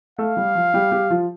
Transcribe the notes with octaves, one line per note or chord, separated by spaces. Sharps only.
A3 A4 F5
G3 G4
F3 F4
G3 G4
G3 G4
F3 F4